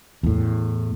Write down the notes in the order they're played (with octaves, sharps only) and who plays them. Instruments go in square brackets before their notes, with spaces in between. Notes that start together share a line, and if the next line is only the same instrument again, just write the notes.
[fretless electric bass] E2 A2